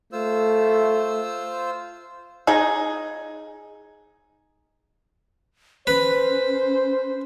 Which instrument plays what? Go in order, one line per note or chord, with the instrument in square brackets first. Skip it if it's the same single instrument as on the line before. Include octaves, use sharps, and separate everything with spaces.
[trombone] A3 [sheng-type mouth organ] F4 C5 E6
[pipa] D#4 G#4
[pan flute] C#4 [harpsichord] B4 [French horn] C5